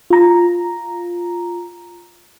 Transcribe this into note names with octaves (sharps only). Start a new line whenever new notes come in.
F4 A#5